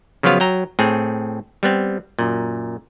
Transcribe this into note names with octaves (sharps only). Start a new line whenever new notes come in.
C#3 F3 F#3 B3 F4 F5
F#3 G5 A#5
A2 C4 G#4
G3 B3 C4
F#2 A#2